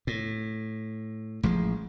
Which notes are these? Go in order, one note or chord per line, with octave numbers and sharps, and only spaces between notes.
A2
A1 F3 G#3